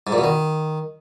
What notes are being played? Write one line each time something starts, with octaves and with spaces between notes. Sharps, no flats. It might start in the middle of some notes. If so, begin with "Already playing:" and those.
G#2
A#2
B2
D#3